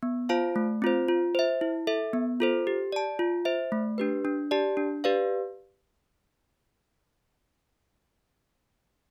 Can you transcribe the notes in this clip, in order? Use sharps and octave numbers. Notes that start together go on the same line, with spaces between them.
B3
F4 C5 F5 A5
A3
C4 F4 C5
F4
C5 E5
E4
A4 E5
B3
F4 A4 C5
G4
D5 A5
F4
C5 E5
A3
D4 G4 B4
D4
G4 D5 A5
D4
G4 B4 D5 F5